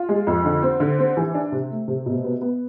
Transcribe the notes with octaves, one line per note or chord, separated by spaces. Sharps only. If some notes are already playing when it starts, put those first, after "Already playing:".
Already playing: F4
G#3
F2
D3
C4
D3
C4
E3
D4
C3
A3
C3
B2
B3
B3